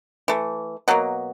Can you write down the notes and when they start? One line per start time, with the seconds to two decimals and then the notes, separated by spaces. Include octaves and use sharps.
0.28 E3 A3
0.88 B2 F#3 A#3